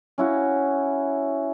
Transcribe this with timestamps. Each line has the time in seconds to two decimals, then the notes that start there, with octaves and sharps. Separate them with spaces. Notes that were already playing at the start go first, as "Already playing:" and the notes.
0.18 C#4 E4 F#4